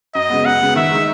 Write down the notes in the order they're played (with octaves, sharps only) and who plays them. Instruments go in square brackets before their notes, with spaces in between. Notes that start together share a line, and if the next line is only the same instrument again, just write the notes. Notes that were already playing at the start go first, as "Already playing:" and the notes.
[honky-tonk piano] F#2 [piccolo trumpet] D#5
[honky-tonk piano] C#3 G#3 B3
[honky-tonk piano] F#2 [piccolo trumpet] F#5
[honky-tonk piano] C#3 G#3 B3
[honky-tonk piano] D#3 [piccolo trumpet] E5
[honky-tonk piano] G#3 D#4